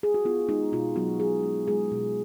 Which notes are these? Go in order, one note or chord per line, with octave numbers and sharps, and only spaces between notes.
G#4
F#4
B3 F4
G#3 D#4
B2 F4
F#3 B3 F#4
B2 G#3 G#4
G#3
G#3 G#4
B2